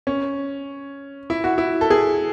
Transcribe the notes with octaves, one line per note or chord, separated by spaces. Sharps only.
C#4
E4
F#4
E4
A4
G#4